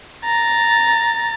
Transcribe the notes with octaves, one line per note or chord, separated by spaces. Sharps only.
A#5 A6